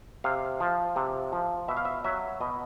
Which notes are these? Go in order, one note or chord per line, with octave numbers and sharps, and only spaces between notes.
C3 F5
F3
C3
F3
B2 E5
F5
E5
F#3 E5
B2 D#5